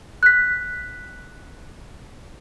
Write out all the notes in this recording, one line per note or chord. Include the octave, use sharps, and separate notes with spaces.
F#6 B6